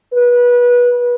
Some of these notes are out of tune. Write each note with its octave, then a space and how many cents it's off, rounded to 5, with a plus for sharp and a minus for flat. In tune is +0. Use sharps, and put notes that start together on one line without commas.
B4 -25